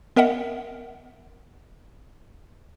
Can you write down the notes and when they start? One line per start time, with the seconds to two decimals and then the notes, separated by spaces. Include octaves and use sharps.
0.16 B3 A#4 D#5 E5 F#5